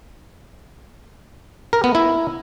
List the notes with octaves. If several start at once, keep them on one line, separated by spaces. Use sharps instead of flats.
A#4
B3
E4